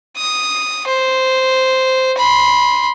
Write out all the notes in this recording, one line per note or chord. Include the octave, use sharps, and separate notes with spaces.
D#6
C5
B5 C6